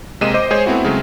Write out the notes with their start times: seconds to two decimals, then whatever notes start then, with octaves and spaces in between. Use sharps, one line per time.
0.21 C3 G#3 A#3 D#5 D#7 E7
0.34 C5 D#5 D6
0.50 G#3 G#4 C5 C#5
0.66 A3 B3 C4 E4 F#4
0.84 C#3 F#3 G#3 A3 C4 C#4